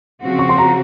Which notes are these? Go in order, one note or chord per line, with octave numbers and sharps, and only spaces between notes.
C#3 F3 C4 F#4
C#6
C6
A#5